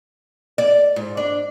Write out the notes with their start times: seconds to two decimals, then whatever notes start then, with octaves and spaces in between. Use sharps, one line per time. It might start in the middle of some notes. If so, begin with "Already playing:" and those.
0.58 D5
0.96 G#2
1.17 D4